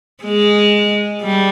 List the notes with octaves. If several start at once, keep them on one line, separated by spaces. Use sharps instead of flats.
G#3
G3